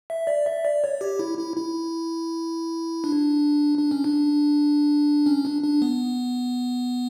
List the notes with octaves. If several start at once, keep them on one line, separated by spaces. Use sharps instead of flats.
E5
D5
E5
D5
C#5
G4
E4
E4
E4
D4
D4
C#4
D4
C#4
D4
D4
B3